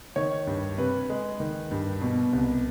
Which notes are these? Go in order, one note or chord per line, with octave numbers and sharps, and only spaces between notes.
D#3 C#5
G2
C3 B4
G#3
D#3
G2
B2
C2